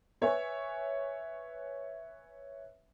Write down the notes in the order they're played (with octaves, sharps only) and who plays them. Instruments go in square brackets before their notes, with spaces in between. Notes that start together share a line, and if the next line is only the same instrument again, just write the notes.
[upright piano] B4 C#5 E5 G#5